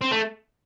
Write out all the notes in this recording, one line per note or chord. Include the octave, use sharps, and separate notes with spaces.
C4
A3